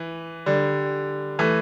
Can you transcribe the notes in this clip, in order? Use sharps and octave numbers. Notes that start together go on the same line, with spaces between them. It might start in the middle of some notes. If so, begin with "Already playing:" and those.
Already playing: E3
D3 G3
E3 A3